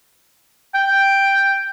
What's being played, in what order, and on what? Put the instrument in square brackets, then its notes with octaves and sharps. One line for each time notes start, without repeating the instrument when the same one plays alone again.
[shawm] G5